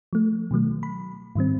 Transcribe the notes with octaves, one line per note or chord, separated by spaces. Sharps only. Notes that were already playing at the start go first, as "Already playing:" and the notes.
F3 A3
B2 D#3 F#3 A3
B5
G#2 D#3 G3 C4